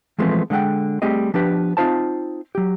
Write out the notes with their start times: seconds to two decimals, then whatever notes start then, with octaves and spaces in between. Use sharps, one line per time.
0.19 E3 F3 G#3 A3 B3 C4
0.50 D3 G#3 D5 F#5 G5
1.02 G3 A3 C4 G4 G#4 D#5
1.34 F3 B3 D4 G4 B4
1.77 C4 D#4 F4 C5 A5
2.55 F#3 G4